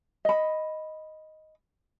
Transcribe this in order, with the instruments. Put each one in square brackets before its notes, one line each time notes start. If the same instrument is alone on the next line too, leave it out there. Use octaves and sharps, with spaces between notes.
[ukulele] D#5 B5